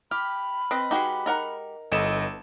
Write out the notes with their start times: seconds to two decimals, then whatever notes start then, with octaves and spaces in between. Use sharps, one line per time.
0.11 G4 B5 F6
0.71 C4 B4 D#5
0.91 G#3 D#4 F#4 G4 B4
1.26 D#4 A#4 F#5
1.92 G1 B3 E4 A4 D#5 E7